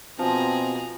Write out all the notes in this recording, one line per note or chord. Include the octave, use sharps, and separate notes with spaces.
B2 F3 C4 G#4 A#5